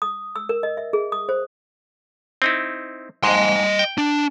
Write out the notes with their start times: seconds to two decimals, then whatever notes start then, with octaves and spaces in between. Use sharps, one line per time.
0.02 D#6
0.36 E6
0.49 A#4
0.63 D#5
0.77 E5
0.93 G#4
1.12 D#6
1.29 C5
2.42 C4 D#4 E4
3.24 F2 G#2 D#5 C6
3.79 G5
3.98 D4